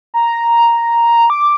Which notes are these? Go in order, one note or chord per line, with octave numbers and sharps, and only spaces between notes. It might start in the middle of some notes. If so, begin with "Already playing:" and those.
A#5
D6